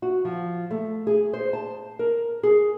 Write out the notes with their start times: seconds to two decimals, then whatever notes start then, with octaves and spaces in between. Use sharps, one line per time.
0.02 F#4
0.25 F3
0.71 A3
1.07 G#4
1.33 C5
1.53 A5
1.99 A#4
2.43 G#4